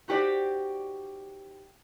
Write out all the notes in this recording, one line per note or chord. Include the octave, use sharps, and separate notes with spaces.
D#4 F#4 G4 C5 D5